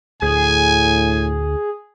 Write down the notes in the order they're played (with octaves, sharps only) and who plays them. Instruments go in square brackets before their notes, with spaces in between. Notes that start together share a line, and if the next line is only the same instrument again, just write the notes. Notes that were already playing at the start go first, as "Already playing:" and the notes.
[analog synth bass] D2 [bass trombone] A2 [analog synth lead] G#4 [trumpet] G#5